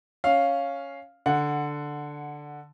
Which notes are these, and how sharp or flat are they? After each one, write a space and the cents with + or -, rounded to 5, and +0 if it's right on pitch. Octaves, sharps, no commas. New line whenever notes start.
C#4 +0 F5 +0
D3 +0 F#5 -5